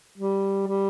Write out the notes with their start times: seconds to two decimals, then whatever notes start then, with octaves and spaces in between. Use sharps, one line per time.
0.18 G3
0.67 G3